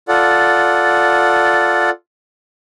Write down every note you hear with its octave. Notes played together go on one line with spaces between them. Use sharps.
F4 A4 D5 F#5